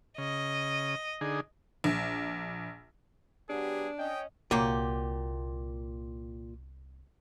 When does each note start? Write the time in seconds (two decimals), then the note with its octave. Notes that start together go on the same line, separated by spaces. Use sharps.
0.18 C#3 D#5
1.21 D3 D#4 G#4
1.84 A#1
3.50 F#3 B3 D4 G4 G#4
3.99 C#4 D#5 G5
4.51 C2 A#2 F#3 A#3 G4